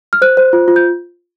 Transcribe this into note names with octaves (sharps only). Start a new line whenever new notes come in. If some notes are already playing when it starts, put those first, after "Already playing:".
F6
C5 F#6
C5
F4
F4
G6